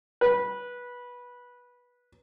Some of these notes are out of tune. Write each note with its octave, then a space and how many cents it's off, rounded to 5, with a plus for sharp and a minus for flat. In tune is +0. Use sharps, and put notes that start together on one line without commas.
B4 -15